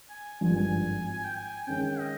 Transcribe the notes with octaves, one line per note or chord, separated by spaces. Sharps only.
G#5
G#1 G2 F3 G#5
G#5
G5
G#5
G#5
D#3 G#3 C#4 G5
G5
D#5